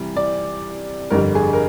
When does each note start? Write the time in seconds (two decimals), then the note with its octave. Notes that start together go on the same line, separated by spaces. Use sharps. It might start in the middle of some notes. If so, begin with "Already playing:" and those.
Already playing: C3 E3 G3
0.16 D5
1.10 G1 F2 D3 G3 A#4
1.35 G#4
1.53 A#4